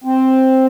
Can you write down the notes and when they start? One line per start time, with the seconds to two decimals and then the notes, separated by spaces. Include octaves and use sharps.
0.04 C4